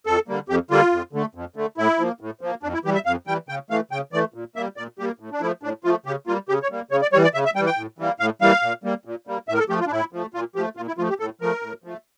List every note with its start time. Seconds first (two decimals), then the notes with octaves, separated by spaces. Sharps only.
0.06 F2 A4
0.28 D3 G3 A#3
0.49 F2 G4
0.71 D3 G3 A#3 F4
0.92 F2
1.13 D3 A3
1.35 F2
1.56 D3 A3
1.77 A2 E4
1.99 F3 A#3
2.21 A2
2.41 F3 A#3
2.63 F2 D4
2.74 E4
2.85 E3 G3 G4
2.95 E5
3.06 F2 F5
3.27 E3 G3 G5
3.49 C#3 G5
3.70 E3 A3 F5
3.91 C#3 G5
4.13 E3 A3 D5
4.34 A#2
4.56 G3 A#3 E5
4.77 A#2 D5
4.99 G3 A#3 G4
5.20 A2
5.32 D4
5.41 F3 A3 E4
5.63 A2 D4
5.84 F3 A3 F4
6.06 C#3 G4
6.27 G3 A#3 F4
6.49 C#3 G4
6.63 C#5
6.70 G3 A#3
6.91 C#3 C#5
7.02 D5
7.13 E3 G3 C#5
7.24 D5
7.34 C#3 E5
7.45 E5
7.55 G3 G5
7.60 E3
7.66 G5
7.77 A2
7.98 E3 G3 A#3
8.20 A2 F5
8.41 E3 G3 A#3 F5
8.63 A#2
8.84 G3 A#3
9.05 A#2
9.27 G3 A#3
9.49 A2 E5
9.54 A#4
9.59 A4
9.69 F3 A3 G4
9.80 F4
9.87 D4
9.91 A2 E4
10.12 F3 A3
10.34 A#2 F4
10.55 F3 A3 G4
10.77 A#2 F4
10.87 E4
10.98 F3 A3 F4
11.09 G4
11.20 A2 A4
11.41 F3 A3 A#4
11.62 A2
11.84 F3 A3